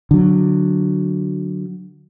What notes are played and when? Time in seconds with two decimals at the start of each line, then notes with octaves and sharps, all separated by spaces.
0.11 D3 F#3